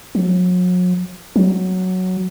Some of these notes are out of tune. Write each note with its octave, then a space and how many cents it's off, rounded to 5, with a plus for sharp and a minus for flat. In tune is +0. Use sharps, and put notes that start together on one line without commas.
F#3 -40
F#3 +0